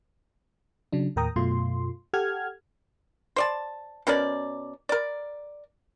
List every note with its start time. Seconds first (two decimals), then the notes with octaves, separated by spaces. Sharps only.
0.92 C#3 F#3 D4
1.16 D#2 A2 A#4 G5 A#5 D#6
1.36 F#2 B2 A3 F4 C6
2.13 G4 A4 F#5 F6 G#6
3.36 C5 D5 A5
4.07 B2 C#4 A#4 D5
4.89 A#4 D5